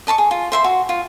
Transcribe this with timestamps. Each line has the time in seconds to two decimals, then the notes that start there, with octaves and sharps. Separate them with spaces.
0.07 D#5 A5 B5 C#6
0.18 G#4
0.31 F4
0.52 C5 E5 C6
0.64 F#4
0.89 F4